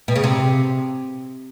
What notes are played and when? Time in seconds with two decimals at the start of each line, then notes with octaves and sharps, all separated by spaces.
0.08 B2
0.16 C#3
0.24 C3